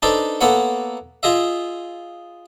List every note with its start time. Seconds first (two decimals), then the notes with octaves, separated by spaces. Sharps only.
0.02 D4 D#4 A4 B4 C5 D5
0.41 A#3 B3 A4 B4 C#5 F#5
1.23 F4 G#4 D#5 E5